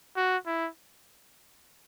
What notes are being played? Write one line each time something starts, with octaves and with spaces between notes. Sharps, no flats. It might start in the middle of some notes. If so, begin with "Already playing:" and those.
F#4
E4